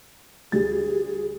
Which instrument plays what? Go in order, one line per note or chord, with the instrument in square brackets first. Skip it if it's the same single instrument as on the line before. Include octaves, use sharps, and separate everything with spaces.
[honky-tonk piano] D2 G3 A6 [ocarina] G#4